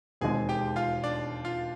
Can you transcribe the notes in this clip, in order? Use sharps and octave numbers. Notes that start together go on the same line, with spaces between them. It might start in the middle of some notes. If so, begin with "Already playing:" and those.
E1 D#2 D#3 G#3 C4 G#4 G#5
G4 G5
F4 F5
D4 D5
F4 F5